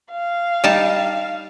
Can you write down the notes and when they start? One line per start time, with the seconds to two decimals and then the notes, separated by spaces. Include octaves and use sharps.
0.12 F5
0.64 G3 D#4 A5